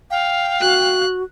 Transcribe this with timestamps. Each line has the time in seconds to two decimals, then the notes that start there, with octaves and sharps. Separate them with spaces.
0.11 F5 G5
0.61 F#4 F#6